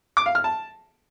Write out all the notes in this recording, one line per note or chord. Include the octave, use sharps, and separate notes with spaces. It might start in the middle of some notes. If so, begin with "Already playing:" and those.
D6
F5
F6
A5